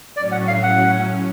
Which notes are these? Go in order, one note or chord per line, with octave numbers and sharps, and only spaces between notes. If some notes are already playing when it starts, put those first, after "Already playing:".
A2 F#3 C#4 D5
F#5
F5
F#5